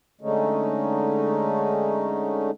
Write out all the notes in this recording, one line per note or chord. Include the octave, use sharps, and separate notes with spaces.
D3 G#3 A3 C#4 D#4